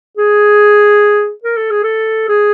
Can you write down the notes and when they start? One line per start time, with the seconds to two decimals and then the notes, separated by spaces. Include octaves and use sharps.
0.17 G#4
1.44 A#4
1.57 A4
1.71 G#4
1.84 A4
2.29 G#4